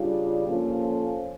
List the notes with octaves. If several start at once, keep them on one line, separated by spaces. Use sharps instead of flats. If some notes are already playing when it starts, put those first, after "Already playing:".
Already playing: C#3 G3 D4 F4
A#2 F3 C#4 F4 A4